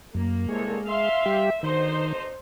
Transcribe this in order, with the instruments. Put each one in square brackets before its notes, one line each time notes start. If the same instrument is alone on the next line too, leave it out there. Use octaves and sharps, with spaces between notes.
[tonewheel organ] F#2 [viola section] A#3
[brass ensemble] C2 A4 C#5 [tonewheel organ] G#3
[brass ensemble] E5 [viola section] F5 C6
[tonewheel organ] G3 G4
[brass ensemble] B1 D3 D#4 [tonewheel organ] D#3 [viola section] C5